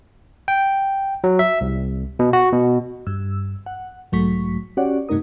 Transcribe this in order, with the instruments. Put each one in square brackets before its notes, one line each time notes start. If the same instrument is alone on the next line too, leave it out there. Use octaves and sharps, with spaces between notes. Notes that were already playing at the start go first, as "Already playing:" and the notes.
[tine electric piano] G5
F#3
E5
C2
B2
F#4
B2
[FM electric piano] G2 E6
F#5
B1 G#2 F#3 A3 C#6 B6
C#4 F#4 G4 C#5 D5 F#5
G2 C3 A3 D#4 A#4 D#6